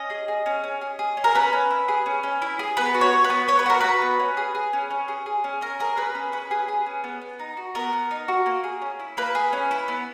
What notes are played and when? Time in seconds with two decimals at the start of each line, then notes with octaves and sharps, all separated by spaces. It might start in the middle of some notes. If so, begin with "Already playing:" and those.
Already playing: C#4 D#5
0.10 G#4
0.28 G#4
0.46 C#4
0.64 C#4
0.81 G#4
0.99 G#4
1.17 C#4
1.24 A#4
1.35 C#4 B4
1.53 C#4
1.70 E4
1.88 G#4
2.06 C#4
2.23 C#4
2.42 E4
2.59 G#4
2.77 B3 B4
2.94 F#4
3.01 C#5
3.12 F#4
3.24 B4
3.30 B3
3.48 B3 C#5
3.59 B4
3.66 F#4 A#4
3.81 F#4 B4
4.02 B3
4.20 C#4
4.37 G#4
4.55 G#4
4.73 C#4
4.91 C#4
5.08 G#4
5.26 G#4
5.44 C#4
5.61 C#4 A#4
5.80 G#4 A#4
5.97 G#4 B4
6.15 C#4
6.32 C#4 B4
6.51 G#4
6.68 G#4
6.86 C#4
7.04 B3
7.22 B3
7.39 D#4
7.57 F#4
7.75 B3 A#4
7.93 B3
8.11 D#4
8.28 F#4
8.46 A#3
8.64 G#4
8.82 C#4
9.00 E4
9.17 A#3 B4
9.35 G#4
9.53 C#4
9.71 E4
9.88 B3